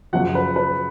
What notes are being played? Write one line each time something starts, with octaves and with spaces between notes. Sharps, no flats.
F#2 C#3 F3 F#5
B4
B4